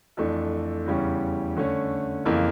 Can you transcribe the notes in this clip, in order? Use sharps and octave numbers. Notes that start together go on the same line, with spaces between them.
F2 E3 A3 D4
E2 C#3 E3 G3 C#4
D3 A3 C#4
F2 C#3 E3 A#3